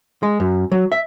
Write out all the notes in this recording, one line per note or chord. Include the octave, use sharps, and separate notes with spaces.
G#3
F#2
F#3
E5